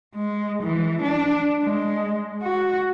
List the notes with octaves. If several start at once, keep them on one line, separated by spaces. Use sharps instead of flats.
G#3
E3
D4
G#3
F#4